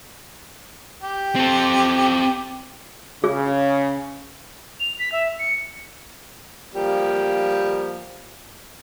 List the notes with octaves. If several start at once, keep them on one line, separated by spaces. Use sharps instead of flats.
G4
C4 A4
C#3 G#4
F7
B6
E5
C#7
F3 G3 A#3